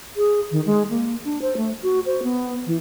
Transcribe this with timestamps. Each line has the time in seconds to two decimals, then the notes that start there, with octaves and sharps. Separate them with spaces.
0.17 G#4
0.52 D#3
0.66 G#3
0.90 A#3
1.25 D4
1.42 C5
1.57 A3
1.82 F#4
2.06 C5
2.23 B3
2.66 E3